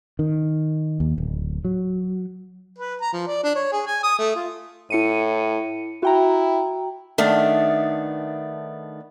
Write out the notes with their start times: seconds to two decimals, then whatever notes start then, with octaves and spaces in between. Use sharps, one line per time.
0.19 D#3
1.00 D#2
1.18 D1
1.65 F#3
2.79 B4
3.01 A#5
3.13 F3
3.27 D5
3.44 D4
3.55 C#5
3.73 G#4
3.87 G#5
4.03 D#6
4.19 A3
4.36 F4
4.90 A2 E4 C#7 D#7
6.03 E4 F#4 G5 A#5
7.18 D#3 A3 B3 D4